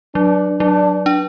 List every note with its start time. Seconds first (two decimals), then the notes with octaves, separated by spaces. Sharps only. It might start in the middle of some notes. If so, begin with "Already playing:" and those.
0.14 F#3 D4
0.60 F#3 D4
1.06 D4